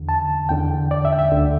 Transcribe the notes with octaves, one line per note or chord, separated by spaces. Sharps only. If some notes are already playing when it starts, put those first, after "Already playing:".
Already playing: E2 D3
A5
E2 D3 G5
D5
E5
G5
E5
D2 D3